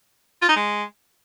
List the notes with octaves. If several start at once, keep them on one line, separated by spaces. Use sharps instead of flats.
F4
D#4
G#3